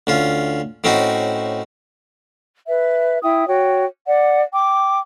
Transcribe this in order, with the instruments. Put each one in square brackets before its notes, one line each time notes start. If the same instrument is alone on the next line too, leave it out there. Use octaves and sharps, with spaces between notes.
[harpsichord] D2 C#4 F4
A2 C4 C#4 D#4 F#4
[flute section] B4 E5
E4 E5 G5 D#6
F#4 C#5 G5
D5 F#5
G5 D6